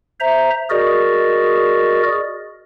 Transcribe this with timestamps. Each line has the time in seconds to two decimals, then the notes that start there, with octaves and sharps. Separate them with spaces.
0.20 C5 E5 A#5
0.70 F#4 G#4 A#4 D5 D#5